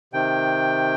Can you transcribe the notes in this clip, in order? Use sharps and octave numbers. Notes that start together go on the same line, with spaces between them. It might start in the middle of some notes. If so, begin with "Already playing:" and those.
C3 D#3 G5